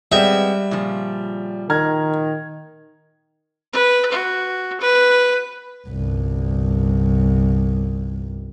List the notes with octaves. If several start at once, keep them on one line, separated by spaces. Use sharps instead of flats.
G3 G#3 B3 C4 E5
A#2 C#3 F3
D#3 A#5 F6 G#6
B4
F#4
B4
G1 C2